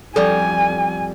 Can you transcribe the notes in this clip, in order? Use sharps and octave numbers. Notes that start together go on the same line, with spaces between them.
F2 G3 A4 D5 G#5